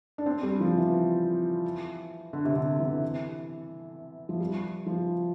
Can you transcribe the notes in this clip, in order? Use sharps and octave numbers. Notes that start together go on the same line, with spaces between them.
D4
C4
G3
F3
E3
D3
C3
D3
E3
F3
G3
F3